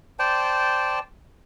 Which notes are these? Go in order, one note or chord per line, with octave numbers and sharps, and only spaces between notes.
C5 D5 G5 A5